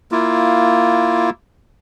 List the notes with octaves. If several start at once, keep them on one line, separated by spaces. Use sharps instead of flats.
A#3 E4 F4